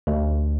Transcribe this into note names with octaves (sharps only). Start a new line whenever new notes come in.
D2